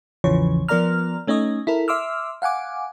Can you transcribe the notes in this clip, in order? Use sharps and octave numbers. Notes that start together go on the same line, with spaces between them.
A1 E2 C#3 E3 F3 C#5
F3 B3 A#4 D5 A#5 F6
A3 C#4 D#4 C#5 D#5
E4 A4 A#4
E5 C6 D6 E6 F6
F5 F#5 G#5 D6